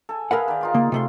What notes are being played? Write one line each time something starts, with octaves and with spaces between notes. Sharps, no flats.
A4 G#5
E4 G#4 A#4 B4 F5 F#5
D#3 D5
D#4 F4 D5
C#3 A#3
C3 A3 C6